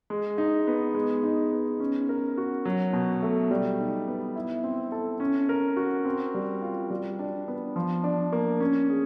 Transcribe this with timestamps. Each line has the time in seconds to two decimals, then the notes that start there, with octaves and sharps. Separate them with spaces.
0.10 G#3
0.38 D#4
0.67 B3
0.95 G#3
1.23 D#4
1.52 B3
1.80 C#4
2.09 A#4
2.37 F#4
2.65 F#3
2.93 B2
3.23 A3
3.51 G3
3.79 D#4
4.08 B3
4.36 E4
4.64 C4
4.92 A4
5.20 C#4
5.49 A#4
5.77 F#4
6.05 C4
6.34 G3
6.62 F4
6.91 G3
7.19 D4
7.48 B3
7.76 F3
8.04 D4
8.33 A#3
8.60 C#4
8.90 G#4